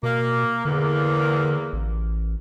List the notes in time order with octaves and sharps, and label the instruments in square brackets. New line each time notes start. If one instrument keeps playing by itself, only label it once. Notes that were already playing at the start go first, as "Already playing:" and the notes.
[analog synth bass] B2 [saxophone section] A#3
[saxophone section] E2 A#3 [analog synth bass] D3
[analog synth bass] A1